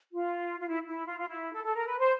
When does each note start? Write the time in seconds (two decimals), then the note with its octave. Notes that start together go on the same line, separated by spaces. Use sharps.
0.13 F4
0.59 F4
0.68 E4
0.88 E4
1.06 F4
1.19 F4
1.28 E4
1.53 A4
1.64 A4
1.75 A#4
1.87 B4
1.99 C5